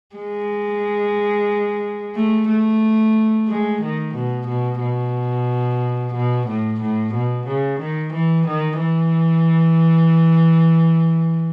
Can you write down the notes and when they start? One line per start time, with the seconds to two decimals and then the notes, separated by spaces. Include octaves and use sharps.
0.16 G#3
2.15 A3
2.49 A3
3.48 G#3
3.81 D#3
4.15 B2
4.47 B2
4.80 B2
6.14 B2
6.47 A2
6.80 A2
7.13 B2
7.47 C#3
7.80 D#3
8.13 E3
8.46 D#3
8.80 E3